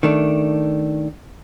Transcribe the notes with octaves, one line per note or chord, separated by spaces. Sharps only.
D#3 A3 D4